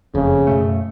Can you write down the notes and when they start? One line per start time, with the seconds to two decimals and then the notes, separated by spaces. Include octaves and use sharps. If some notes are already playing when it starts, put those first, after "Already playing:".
0.15 F#1 F2 C#3
0.47 F#2 B2 A3